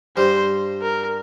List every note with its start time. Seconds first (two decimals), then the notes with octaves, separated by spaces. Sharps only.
0.17 G2 G3 C5
0.82 A#4